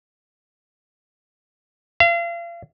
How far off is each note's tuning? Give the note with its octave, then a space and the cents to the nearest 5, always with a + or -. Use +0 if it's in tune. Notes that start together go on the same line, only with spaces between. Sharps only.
F5 -40